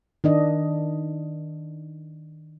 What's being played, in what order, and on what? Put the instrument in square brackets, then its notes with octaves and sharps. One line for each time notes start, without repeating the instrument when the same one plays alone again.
[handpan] D#3 D4 D#5